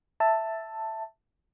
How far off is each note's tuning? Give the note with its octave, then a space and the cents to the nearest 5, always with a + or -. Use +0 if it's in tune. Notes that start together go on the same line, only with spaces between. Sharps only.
E5 +0 A5 +10